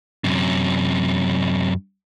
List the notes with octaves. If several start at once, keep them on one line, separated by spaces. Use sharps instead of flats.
F#2 C3